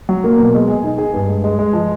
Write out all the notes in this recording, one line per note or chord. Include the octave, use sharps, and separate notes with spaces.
F#3
A#3
B2
G#3
G#4
D#4
G#4
G2
G#3
G#3
G#3
F3